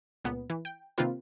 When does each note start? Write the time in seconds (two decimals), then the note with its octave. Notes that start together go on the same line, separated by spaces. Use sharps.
0.24 C#2 A#2 B3
0.50 E3
0.65 G5
0.98 C3 D#3 A#3 C4 F4 B4